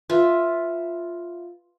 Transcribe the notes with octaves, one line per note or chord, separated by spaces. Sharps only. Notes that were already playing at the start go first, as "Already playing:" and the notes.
F4 B4 E5